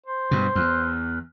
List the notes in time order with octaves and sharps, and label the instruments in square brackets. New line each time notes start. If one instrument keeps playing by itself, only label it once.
[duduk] C5
[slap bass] G2 B2
E2